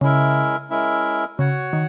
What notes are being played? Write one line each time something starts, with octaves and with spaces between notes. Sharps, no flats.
C#3 G#3 C#4 E4 A#4 E5
G#3 C#4 E4 A#4 E5
C#3 F#4 C#5 F#5
D#3